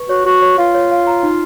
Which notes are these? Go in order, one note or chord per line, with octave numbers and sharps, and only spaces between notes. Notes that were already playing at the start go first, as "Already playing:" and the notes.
Already playing: B4 C#6
F#4 C#5
F#4 C#6
C#5
F4 F5
C#5
F5
A#5
D#4